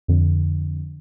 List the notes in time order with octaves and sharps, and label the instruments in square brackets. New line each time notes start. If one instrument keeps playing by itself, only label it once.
[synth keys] F2 D3